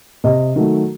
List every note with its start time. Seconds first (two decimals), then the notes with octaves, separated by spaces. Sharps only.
0.24 C3 D#5
0.56 D#3 F#3 A3